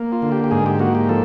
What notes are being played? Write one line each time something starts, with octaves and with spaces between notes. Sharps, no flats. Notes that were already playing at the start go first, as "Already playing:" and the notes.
Already playing: A#3
F4
D3
G4
G4
G#2 G#4
G4
A#3 F#4
G4
F3 A4